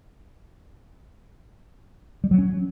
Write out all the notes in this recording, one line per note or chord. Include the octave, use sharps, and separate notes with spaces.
G3
F#3
C#4